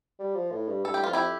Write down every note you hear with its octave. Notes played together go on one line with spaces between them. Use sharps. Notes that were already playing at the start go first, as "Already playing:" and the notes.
G3
F3
A2
G2
G2 A4
G4
F2 F4
E4 G4